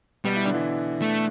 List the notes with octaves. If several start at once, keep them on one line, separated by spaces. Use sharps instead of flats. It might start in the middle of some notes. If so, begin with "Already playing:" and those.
B2 G3 B3
E4
D3 D4
E3 E4
A3